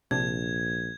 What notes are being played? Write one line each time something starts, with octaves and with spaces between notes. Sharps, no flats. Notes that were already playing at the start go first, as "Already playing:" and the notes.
A#1 C3 D4 G#6